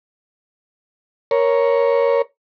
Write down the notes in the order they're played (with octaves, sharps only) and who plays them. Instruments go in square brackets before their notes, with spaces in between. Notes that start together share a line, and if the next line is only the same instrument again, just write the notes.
[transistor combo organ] A#4 C#5